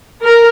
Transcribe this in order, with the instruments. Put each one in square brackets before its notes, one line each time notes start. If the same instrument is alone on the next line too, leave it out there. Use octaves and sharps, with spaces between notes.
[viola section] A#4